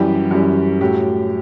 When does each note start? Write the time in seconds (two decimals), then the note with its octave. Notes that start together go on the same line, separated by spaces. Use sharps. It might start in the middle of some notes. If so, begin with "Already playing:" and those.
Already playing: F#2 E3 G3 G4
0.31 F#2 E3 G3
0.81 A2 F#3 G4